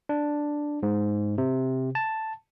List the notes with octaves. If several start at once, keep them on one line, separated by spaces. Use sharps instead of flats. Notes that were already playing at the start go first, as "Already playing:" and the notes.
D4
G#2
C3
A5